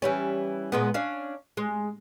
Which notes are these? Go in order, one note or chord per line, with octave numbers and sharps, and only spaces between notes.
E3 G3 C#4
A#2 G#3 B3
C#4 D4 F5
G#3